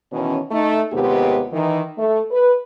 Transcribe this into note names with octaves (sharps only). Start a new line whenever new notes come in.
B2 D#3 E3 C#4
A3 D#4
D#2 C3 G#3 B3 F4 G4
D#3 E3
A3
B4